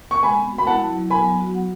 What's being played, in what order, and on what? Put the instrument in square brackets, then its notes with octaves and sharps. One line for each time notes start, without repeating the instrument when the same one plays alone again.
[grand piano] C#6
[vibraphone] G#3 [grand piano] G#5 B5
[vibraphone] B3
F#4
[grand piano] B5
[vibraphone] E4 [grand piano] F#5 A5
[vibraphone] F#3
F#3
[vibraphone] B3 [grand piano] G#5 B5
[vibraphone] F#3
F#4
F#5